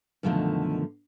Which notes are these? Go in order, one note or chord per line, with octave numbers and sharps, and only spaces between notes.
F#2 B2 D3 D#3 F3 A3